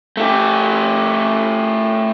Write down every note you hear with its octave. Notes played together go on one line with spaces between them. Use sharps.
A3 G4